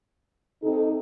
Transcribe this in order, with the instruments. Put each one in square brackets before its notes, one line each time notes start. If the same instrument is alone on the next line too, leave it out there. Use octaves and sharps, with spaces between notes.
[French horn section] C3 D#4 [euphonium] A4